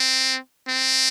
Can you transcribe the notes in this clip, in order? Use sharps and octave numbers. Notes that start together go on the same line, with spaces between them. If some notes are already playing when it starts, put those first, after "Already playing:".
Already playing: C4
C4